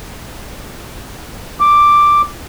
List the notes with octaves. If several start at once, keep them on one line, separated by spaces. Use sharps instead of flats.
D6